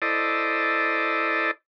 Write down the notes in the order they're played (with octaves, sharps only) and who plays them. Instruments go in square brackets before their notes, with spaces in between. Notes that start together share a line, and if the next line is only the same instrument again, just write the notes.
[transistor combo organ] E4 A4 C5 D5 D#5